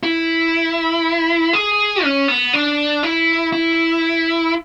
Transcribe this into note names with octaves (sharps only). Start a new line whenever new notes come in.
E4
G#4
C#4
B3
D4
E4
E4